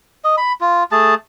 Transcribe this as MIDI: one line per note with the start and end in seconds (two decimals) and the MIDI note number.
0.24 0.36 75
0.37 0.53 83
0.61 0.84 65
0.92 1.15 57
0.92 1.15 68
0.92 1.15 81